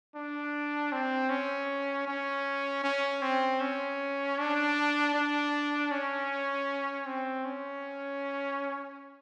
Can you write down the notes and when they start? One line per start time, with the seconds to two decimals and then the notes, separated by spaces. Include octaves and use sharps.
0.15 D4
0.92 C4
1.30 C#4
2.07 C#4
2.84 C#4
3.22 C4
3.61 C#4
4.38 D4
5.14 D4
5.91 C#4
7.06 C4
7.45 C#4